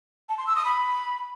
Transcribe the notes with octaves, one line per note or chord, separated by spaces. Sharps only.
A5
C6
E6
D#6
B5